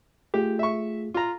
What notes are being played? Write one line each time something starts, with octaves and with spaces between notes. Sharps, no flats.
A3 F4 G4 G#4
E5 C#6
F4 A#5